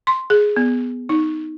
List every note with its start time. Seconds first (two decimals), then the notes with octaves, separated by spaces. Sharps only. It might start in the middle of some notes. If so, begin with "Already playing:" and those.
0.07 C6
0.30 G#4
0.56 B3
1.09 D#4